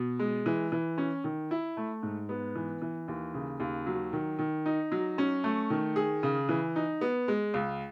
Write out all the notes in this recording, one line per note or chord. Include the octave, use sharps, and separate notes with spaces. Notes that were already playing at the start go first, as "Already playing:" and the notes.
Already playing: B2
G#3
E3
E3
C#4
D#3
E4
A3
G#2
B3
E3
E3
D#2
C#3
D#2
F#3
D#3
D#3
D#4
F#3
C#4
A3
D#3
G#4
C#3
E3
D#4
B3
G#3
C#2